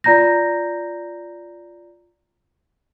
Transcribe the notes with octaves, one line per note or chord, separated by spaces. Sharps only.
F4 D5 A#5 G6 A#6